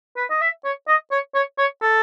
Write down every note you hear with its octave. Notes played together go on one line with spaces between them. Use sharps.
B4
D#5
E5
C#5
D#5
C#5
C#5
C#5
A4